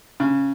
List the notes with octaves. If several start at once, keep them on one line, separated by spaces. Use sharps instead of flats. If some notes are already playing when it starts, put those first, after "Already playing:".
C#3